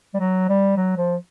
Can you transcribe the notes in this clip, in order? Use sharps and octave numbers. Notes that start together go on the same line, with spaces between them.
G3
F#3
G3
F#3
F3